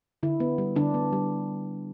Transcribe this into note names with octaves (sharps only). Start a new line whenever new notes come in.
D3 E4
B3
G3
D3 D4
B3
G3